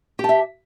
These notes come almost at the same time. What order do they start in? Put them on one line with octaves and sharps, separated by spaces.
G4 A5 E5